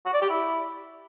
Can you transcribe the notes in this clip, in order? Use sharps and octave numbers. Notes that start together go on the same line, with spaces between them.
F#4
D5
G4
E4